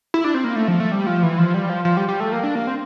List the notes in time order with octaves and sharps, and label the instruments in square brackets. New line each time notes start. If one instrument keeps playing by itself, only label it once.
[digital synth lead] E4
D4
C4
A#3
A3
F3
A3
G3
F3
E3
F3
G3
F3
F3
G3
G3
A3
A#3
D4
A#3
C4